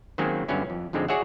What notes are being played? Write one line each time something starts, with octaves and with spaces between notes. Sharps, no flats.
D#3 F#3 G#3 A#3 C4 C#4
G2 D3 F#3 B3 C#4 E4
F2
F2 G#2 D3 G#3 C4
F#4 G#4 C#5 D5 E5 F#5